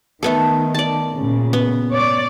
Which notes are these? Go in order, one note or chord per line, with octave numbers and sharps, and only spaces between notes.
D#3 A3 B3 A4
D5 A5
A#2 C#3
B3
C#5 D5